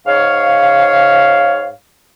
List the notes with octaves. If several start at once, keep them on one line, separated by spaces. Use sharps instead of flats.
G#2 C#5 F5